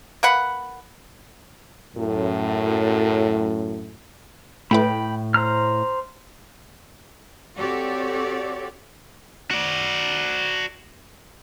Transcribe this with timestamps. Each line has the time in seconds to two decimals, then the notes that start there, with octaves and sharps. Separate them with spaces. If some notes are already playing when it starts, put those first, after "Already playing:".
0.23 A#3 B4 F#5 B5
1.96 F#2 A2
4.71 A2 A3 E4 B4 G5 B5
5.34 C5 A#5 F6
7.55 C4 F#4 G4 A4 C#5 D5
9.51 F#4 D5